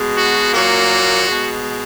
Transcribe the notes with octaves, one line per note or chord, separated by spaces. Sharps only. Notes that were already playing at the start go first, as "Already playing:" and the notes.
Already playing: B2 G#3
F#4
A#2 F#3 A#3 F#4
B2 G#3